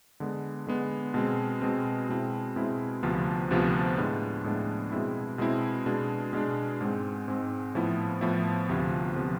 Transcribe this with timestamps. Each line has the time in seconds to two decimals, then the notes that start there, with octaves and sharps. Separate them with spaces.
0.20 D3 G#3 B3
0.67 D3 G#3 B3
1.14 B2 G#3 C4
1.61 B2 G#3 C4
2.09 B2 G#3 C4 E4
2.56 B2 G#3 C4 E4
3.03 D2 C3 F3 B3 F4
3.51 D2 C3 F3 B3 F4
3.98 A2 G#3 B3 D4
4.44 A2 G#3 B3 D4
4.92 B2 G#3 C4 E4
5.38 B2 G#3 C4 E4
5.86 B2 G#3 D4
6.33 B2 G#3 D4
6.81 G#2 G#3 C4
7.28 G#2 G#3 C4
7.75 A2 F3 B3 E4
8.21 A2 F3 B3 E4
8.69 D2 C3 F3 B3 F4
9.16 C3 F3 B3 F4